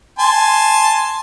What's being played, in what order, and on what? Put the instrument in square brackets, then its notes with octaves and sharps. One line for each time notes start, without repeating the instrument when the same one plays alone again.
[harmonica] G#5 A5 C6